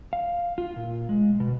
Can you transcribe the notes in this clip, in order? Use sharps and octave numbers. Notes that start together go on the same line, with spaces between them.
F5
F4
A#2
G#3
B2